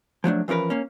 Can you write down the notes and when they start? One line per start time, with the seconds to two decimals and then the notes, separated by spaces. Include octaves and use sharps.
0.24 F3 F#3 A3 D4
0.48 E3 F3 C#4 A#4 B4
0.70 A#3 C#4